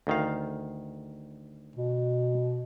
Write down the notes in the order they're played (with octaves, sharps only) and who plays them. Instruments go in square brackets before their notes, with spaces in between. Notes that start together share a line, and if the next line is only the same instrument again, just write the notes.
[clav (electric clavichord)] D2 D#3 F5
[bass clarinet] B2